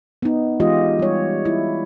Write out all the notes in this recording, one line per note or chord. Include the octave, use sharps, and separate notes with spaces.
B3 D#4
E3 G#3 F4 G4 D#5
G3 C#5
E4